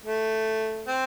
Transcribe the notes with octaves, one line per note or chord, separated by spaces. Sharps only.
A3
C4